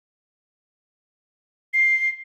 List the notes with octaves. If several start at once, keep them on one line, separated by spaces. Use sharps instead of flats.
C7